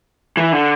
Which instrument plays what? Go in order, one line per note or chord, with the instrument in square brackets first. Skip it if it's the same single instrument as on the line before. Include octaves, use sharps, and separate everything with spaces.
[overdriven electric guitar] E3
D3